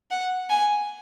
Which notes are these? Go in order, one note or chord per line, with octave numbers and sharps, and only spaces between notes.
F#5
G#5